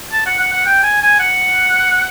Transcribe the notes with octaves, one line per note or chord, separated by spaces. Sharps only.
A5
F#5
F#5
F#5
G5
G#5
G#5
F#5